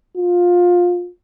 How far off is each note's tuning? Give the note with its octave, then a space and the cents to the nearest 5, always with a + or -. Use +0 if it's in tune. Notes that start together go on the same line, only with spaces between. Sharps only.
F4 +20